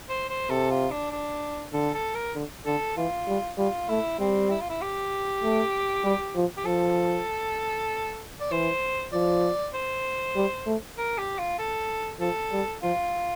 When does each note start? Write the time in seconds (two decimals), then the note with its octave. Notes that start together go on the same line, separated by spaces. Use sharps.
0.09 C5
0.29 C5
0.50 C3 A4
0.71 F4
0.90 D4
1.11 D4
1.73 D3 A4
1.94 A4
2.15 A#4
2.35 D3
2.65 D3 A4
2.97 E3 F4
3.28 G3
3.58 G3 F4
3.88 A3 E4
4.19 G3 C4
4.51 E4
4.61 F4
4.70 E4
4.81 G4
5.43 A3
6.04 G3
6.35 F3
6.57 G4
6.66 F3 A4
8.40 D5
8.51 E3 C5
9.12 F3 D5
9.74 C5
10.36 G3
10.66 A3
10.98 A#4
11.18 G4
11.39 F4
11.59 A4
12.20 F3 A4
12.52 G3
12.82 F3 F4